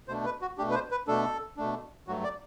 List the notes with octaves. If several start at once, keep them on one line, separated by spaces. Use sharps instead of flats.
B2 A3 D4 C5
B4
F#4
B2 A3 D4 G4
B4
C5
B4
B2 A3 D4 A4
B2 A3 D4
G2 F#3 A3 F#4
D5